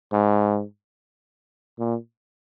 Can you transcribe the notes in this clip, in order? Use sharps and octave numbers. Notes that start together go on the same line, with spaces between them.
G#2
A#2